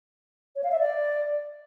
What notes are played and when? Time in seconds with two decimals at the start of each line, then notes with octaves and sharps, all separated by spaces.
0.55 C#5
0.63 F5
0.71 E5
0.79 D5